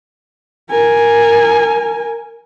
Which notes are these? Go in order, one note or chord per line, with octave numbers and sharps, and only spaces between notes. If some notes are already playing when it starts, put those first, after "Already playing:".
A#4 G#5